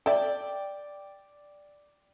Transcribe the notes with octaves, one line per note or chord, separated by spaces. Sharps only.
A4 D5 E5 G5